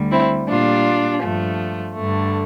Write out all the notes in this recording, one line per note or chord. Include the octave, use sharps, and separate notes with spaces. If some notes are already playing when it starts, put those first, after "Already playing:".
Already playing: D2 D3 G3
C4 E4
A#2 G3 D4 F4
G2 F3 A3
G2 D3 A3